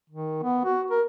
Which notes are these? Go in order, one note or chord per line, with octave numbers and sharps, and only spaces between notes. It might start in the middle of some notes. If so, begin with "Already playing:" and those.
D#3
B3
F#4
A#4